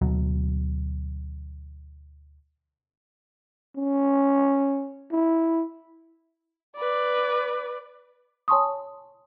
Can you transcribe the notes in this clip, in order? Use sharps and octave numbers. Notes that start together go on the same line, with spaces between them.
D2 B2 F#3
C#4
E4
B4 D5
C#5 G#5 A5 C6 C#6 D#6